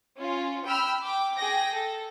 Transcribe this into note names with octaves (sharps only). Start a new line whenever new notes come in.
C#4 F4
G5 B5 E6 F6
G5 D6
G#4 G5 A#6
A4